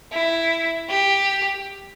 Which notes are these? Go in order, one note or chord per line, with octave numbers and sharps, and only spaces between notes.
E4
G4